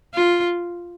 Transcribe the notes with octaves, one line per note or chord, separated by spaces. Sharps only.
F4